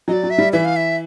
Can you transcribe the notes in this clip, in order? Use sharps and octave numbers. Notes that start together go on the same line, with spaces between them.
F#3 D5 D#5
F#3
E5
G3
E3 E5
F5
E5